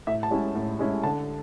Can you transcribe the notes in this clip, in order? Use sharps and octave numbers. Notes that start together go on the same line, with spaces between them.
A2 E5
A5
G#3 C#4 E4
A2
G#3 C#4 E4
D3 A5